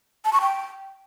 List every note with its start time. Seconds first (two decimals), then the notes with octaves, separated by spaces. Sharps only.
0.25 A5
0.33 C#6
0.41 G5